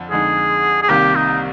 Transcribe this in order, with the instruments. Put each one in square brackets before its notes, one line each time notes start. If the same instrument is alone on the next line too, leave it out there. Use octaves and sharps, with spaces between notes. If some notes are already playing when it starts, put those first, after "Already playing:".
Already playing: [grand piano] F2 D3
[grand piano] F2 D3 G#3 D#4 [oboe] G#4
[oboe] G#4
[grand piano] C2 C3 D#3 A#3 [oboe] G4
[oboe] D#4